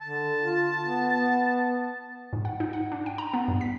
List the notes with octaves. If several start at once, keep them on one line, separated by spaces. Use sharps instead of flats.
D3 A5
F4
B3
B3
G#2
F#5
D#4
F#5
D4
G5
A#5
B3
G2
B6